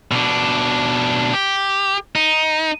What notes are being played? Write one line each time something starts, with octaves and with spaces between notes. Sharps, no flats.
B2 D4
G4
D#4